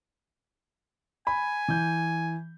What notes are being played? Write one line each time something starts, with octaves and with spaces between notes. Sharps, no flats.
G#5 B5
E3 G6